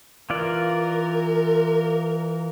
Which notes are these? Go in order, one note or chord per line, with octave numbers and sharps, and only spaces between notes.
E3 F4 A#4 D5